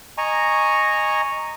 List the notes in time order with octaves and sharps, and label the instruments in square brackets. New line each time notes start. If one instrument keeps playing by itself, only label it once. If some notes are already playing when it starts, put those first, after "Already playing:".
[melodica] D#5 G#5 A#5 C#6